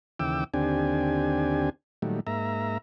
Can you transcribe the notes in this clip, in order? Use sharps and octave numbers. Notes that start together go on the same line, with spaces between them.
D#2 C#3 E3 G5 D6 E6
D#2 D3 C4 D4 G4 G#5
A#2 D#3 F#3 G3 A3
G#2 A#3 E5 A#5